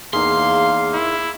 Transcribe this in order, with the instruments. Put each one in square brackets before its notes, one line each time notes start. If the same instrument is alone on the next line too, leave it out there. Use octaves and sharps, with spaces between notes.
[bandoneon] E2 A#3 F5 [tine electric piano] D#4 G#4 [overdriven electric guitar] C6
[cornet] E4